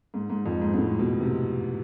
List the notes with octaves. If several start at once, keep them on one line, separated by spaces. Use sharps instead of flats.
G#2
G#2
F2
G#2
G#2
A2
B2
C3